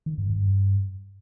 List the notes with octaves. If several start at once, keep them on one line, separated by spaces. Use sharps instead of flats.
D#3
G2
G2